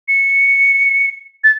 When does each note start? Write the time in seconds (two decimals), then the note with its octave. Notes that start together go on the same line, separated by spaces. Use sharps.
0.08 C#7
1.44 A6